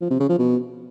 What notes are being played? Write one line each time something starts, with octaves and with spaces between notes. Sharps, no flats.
F3
C3
C#3
F3
B2